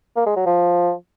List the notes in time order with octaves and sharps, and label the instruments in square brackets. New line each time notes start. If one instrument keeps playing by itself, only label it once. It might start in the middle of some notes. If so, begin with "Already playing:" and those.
[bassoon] A#3
G#3
F#3
F3